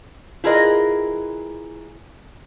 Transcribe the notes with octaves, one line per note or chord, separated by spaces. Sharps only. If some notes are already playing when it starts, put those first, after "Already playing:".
E4 F4 G#4 A#4 B4 D#5